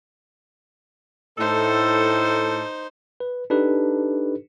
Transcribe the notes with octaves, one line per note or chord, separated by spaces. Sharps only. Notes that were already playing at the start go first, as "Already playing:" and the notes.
A2 D#4 A4 C5
B4
D4 D#4 G4 A4 B4